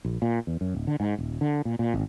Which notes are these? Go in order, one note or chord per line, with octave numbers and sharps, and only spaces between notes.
A#1
A#2
E2
F#2
D1
D3
G#2
D#1
D3
A#2
A#2
G#1